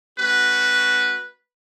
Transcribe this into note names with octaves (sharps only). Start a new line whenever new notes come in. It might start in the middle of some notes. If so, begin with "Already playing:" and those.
A3 C#4 F#4 B4